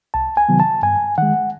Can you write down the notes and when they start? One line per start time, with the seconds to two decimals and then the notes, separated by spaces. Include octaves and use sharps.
0.14 C2 A5
0.37 G#5
0.49 C3 D#3 F#3 B3
0.60 A5
0.83 G2 G#5
1.18 D#3 G#3 F#5